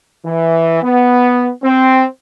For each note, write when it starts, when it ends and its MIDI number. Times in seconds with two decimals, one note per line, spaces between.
0.24 0.81 52
0.82 1.49 59
1.63 2.05 60